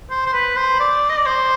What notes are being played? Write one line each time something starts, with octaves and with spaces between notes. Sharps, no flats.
C5
C5
B4
C5
D5
D#5
D5
C5